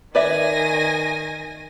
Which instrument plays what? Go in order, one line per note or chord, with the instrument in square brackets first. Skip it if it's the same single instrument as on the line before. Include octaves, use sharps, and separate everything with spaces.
[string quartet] D#3 G#5 A#6 [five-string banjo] B4 D5 E5